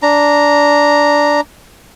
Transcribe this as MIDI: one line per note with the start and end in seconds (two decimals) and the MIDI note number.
0.02 1.41 62
0.02 1.41 82